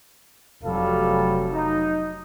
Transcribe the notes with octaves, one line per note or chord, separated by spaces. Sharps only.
F1 F#3 G3 A4 F5
D#4